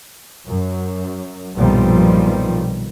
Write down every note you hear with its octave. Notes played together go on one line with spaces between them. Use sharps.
F#2
B1 G2 A#2 D#3 F3 G3